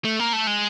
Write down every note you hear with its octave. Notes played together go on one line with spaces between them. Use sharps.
A3
A#3
A3
G#3